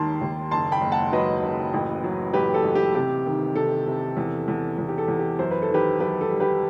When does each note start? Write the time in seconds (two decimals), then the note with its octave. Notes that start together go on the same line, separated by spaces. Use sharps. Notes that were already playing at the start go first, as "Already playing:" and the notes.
Already playing: D#2 D#3 G3 A5 C6
0.21 D#2
0.51 F#1 A5 C6
0.72 G5 B5
0.81 F#1
0.91 F#5 A5
1.12 F#3 B4 D#5
1.42 F#1
1.74 A1
2.04 F#3
2.34 A1 G4 B4
2.54 A4
2.64 A1
2.75 G4
2.95 C3 G4
3.26 D#3
3.56 C3 A4
3.87 C3
4.17 E2
4.48 E2
4.78 E2
4.89 G4
4.98 A4
5.08 E2
5.19 G4
5.39 F#2 C5
5.51 B4
5.62 A4
5.69 D#3 G4 B4
6.00 F#2 G4 B4
6.21 A4
6.31 G3
6.40 G4 B4